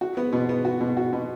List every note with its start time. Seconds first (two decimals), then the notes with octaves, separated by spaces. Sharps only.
0.01 F#4
0.17 B3
0.33 B2
0.49 B3
0.65 F#4
0.81 B2
0.97 F#4
1.13 B2